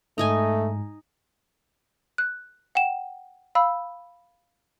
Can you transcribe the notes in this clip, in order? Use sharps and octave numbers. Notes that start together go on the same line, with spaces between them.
G#2 A3 D#4 D#5 G#5
F#6
F#5 G5 E7
F5 B5 E6